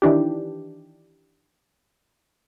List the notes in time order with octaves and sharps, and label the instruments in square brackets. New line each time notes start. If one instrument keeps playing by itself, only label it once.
[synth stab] D#3 E3 D4 G4